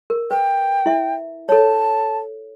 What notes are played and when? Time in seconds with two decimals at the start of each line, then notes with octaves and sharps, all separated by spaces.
0.10 A#4
0.31 B4 G5
0.86 E4 E5
1.49 A4 C#5 A5